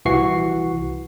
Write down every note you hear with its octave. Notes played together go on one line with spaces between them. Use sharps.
C2 E3 F#4 C#6 C7